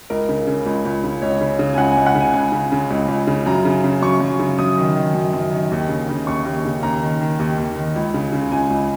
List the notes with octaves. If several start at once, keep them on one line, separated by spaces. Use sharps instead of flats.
C#2 A#4
C#3
C#3
C#2
C#2
C#3
C#2 C#5
C#3
C#3
G#5
C#2 F#5
G#5
C#2
F#5
C#3
G#5
C#2 G#5
C#3
C#3
C#2
C#2
C#3
F#2 A#5
C#3
C#3
F#2 C#6
F#2
C#3
F#2 D#6
D#3
D#3
F#2
F#2
D#3
D#2
C#3
C#3
D#2 C#6
D#2
C#3
D#2 A#5
D#3
D#3
D#2
D#2
D#3
C#2
C#3
C#3
C#2 G#5
C#2